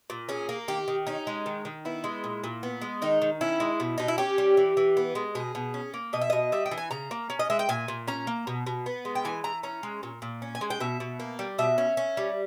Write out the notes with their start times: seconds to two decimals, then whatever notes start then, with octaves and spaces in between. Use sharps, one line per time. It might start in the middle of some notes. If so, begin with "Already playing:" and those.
0.10 A#2
0.29 C#4 G#4
0.49 A#3
0.68 D#3 G4
0.88 D#3
1.07 C#4 D#4
1.27 G#3
1.46 D#3
1.65 D#3
1.85 B3 E4
2.04 G#3
2.24 A#2
2.44 A#2
2.63 B3
2.82 G#3
3.02 D#3 D#4
3.22 D#3
3.41 C#4 E4
3.60 G#3
3.80 B2
3.98 B2 D#4
4.08 E4
4.18 C#4 G4
4.38 G3
4.57 E3
4.77 E3
4.97 B3
5.15 G#3
5.35 B2 G#4
5.55 B2
5.74 C#4
5.94 A#3
6.13 B2 D#5
6.21 E5
6.30 B2 D#5
6.52 G3 E5
6.66 G5
6.71 E3
6.78 G#5
6.91 C#3 A#5
7.11 A#3
7.30 C#4
7.39 D#5
7.50 G#3 E5
7.59 G5
7.69 A#2 G#5
7.88 A#2
8.08 C#4 A#5
8.27 A#3
8.47 B2
8.67 B2
8.86 B3
9.05 G#3
9.15 G5
9.25 E3 G#5
9.44 E3 A#5
9.63 C#4 A#5
9.83 G#3
10.03 A#2
10.22 A#2
10.42 C#4
10.55 G#5
10.61 G#3
10.70 G5
10.80 B2 E5
11.00 B2
11.20 A#3
11.39 G3
11.58 B2 E5
11.78 C#4
11.97 C#4
12.17 G3